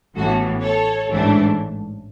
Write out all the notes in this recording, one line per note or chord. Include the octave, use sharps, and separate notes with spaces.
A1 A2 E3 B3 F#4 A4
A4 C#5
A1 G#2 E3 A3 D4